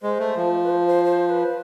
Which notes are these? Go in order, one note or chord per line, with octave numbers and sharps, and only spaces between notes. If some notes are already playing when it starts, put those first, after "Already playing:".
G#3 C5
A3
F3
B4
C5
C5
C5
B4